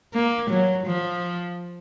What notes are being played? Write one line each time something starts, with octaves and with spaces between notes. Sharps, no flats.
A#3
F#3
F3